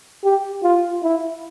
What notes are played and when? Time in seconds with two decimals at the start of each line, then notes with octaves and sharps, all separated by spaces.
0.24 G4
0.63 F4
1.03 E4